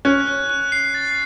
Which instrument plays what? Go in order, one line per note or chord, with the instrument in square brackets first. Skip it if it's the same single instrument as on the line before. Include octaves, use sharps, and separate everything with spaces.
[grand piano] C#4 [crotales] F#6
[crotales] F#6
F#6
C7
A6